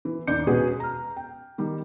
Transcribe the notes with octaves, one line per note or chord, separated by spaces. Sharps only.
E3
D#2 D4 D5 G6 C#7
B2 G#3 C#4 F#4 G#4 B4
A#5 F6
G5
D#3 G3